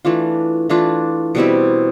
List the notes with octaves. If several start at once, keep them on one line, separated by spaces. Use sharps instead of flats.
E3 A3 D4 F4
E3 A3 D4 F4
B2 G3 C4 E4